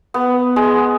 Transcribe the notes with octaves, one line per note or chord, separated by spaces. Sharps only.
B3
G#3